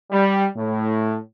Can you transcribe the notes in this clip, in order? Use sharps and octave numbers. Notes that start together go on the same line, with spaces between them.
G3
A2